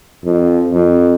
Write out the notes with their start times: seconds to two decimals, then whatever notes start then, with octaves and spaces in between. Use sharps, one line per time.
0.25 F2
0.72 F2